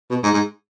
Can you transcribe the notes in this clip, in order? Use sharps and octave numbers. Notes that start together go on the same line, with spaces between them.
B2
G#2
G#2